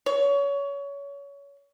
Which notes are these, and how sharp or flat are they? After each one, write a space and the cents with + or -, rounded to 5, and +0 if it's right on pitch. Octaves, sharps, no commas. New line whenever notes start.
C#5 +25